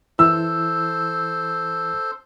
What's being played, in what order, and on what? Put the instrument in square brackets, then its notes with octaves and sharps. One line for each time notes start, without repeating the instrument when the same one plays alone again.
[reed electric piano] E3 E4 [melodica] A4 C5 [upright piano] E6